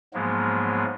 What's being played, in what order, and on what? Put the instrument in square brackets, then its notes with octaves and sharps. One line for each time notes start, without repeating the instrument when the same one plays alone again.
[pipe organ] G#2 F3 F#3 G#3 A#3 B3